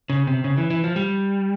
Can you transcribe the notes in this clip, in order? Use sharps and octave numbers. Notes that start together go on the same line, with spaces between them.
C#3
C3
C#3
E3
E3
F3
G3